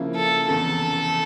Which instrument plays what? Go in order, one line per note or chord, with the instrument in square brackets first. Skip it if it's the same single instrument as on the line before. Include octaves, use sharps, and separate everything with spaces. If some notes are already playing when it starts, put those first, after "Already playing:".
Already playing: [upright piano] C#3 F3 A#3 E4
[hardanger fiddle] A4
[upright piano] F1 E2 C#3 [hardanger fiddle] A4